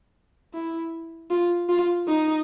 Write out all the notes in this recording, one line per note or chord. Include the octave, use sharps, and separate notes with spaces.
E4
F4
F4
D#4